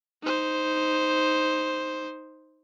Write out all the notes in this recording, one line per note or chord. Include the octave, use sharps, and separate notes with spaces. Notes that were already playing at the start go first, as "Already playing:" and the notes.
D#4 C5